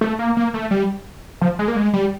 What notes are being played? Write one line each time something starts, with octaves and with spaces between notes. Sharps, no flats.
A3
A#3
A#3
A3
G3
F3
G#3
A#3
G#3
G3